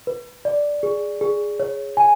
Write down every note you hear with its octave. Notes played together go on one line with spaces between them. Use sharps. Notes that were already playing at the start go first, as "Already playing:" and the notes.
B4
D5
G#4
G#4
C#5
G#5